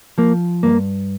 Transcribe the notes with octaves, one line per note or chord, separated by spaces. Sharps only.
F3 A#3
G2 A#3